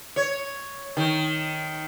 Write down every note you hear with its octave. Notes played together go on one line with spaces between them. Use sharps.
C#5
D#3